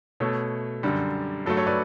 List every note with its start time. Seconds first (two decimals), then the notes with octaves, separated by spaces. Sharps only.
0.20 B2 A3 A4 C#5
0.83 F#2 D3 G3
1.46 G2 F#3 A3 A4
1.57 A4 C#5
1.67 B4 D5